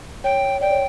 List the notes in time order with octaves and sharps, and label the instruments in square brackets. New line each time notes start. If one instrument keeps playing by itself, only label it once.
[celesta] C#5 [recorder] G5
[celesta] D5 [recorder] G5
[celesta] C#5